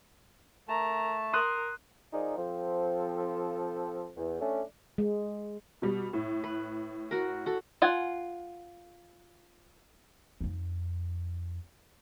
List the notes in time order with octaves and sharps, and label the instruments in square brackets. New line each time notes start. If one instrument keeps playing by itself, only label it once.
[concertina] A3 A5 [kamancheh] A#4 A#5
[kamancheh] A#4 [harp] C6 D#6 F#6
[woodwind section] F3 D#4 G#4 A#4 D5
F3 C4 A4
E2
A3 C#4 D4
[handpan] G#3
[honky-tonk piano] B2 G3
A2
[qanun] B4
F#4 A#4
F#4 A4
[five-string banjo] F4 F#5 G#5
[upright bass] F2 D#4